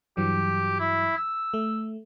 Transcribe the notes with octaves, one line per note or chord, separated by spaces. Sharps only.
G2 E3 F#3 G4
E4
E6
A3